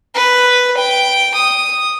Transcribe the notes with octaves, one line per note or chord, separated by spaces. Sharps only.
B4
G5
D#6